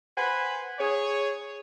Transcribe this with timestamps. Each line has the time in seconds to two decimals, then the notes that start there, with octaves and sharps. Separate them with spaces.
0.18 B4 C5 F#5 G#5 B5
0.79 G#4 C#5